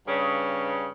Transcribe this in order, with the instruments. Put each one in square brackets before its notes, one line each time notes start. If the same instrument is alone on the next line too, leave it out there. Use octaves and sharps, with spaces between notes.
[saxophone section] G2 C#3